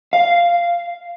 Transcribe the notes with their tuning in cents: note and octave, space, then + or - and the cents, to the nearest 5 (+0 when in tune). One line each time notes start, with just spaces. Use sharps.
F5 -10